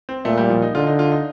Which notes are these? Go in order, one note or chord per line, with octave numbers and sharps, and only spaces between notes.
C4
A#2 A3
G3
F3
D#4
D3 F4
D#4
F4
D#4